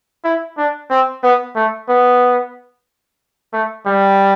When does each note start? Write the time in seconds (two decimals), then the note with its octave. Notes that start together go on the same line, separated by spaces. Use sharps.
0.24 E4
0.58 D4
0.90 C4
1.23 B3
1.56 A3
1.89 B3
3.53 A3
3.86 G3